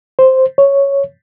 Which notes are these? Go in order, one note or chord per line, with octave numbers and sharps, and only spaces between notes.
C5
C#5